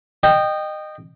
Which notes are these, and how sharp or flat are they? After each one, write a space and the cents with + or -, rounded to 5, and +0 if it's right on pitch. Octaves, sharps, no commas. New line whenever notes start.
D#5 -20 G5 +0